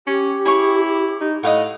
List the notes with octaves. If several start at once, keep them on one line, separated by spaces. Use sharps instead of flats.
C#4 G4
E4 G#4 C#5 C#6
D#4
A2 D#5 F5 F#5